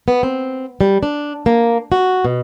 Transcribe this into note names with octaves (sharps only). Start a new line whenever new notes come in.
B3
C4
G3
D4
A#3
F#4
B2